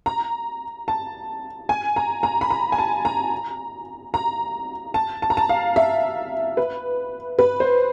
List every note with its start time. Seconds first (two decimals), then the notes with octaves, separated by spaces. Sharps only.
0.06 A#5
0.88 A5
1.69 G#5
1.96 A#5
2.23 A#5
2.41 B5
2.50 A#5
2.72 G#5
2.78 A5
3.05 A#5
4.14 A#5
4.94 A5
5.22 A5
5.30 A#5
5.37 A5
5.49 F5
5.76 E5
6.57 B4
7.39 B4
7.60 C5